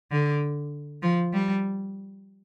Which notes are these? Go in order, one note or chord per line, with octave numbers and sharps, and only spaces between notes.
D3
F3
G3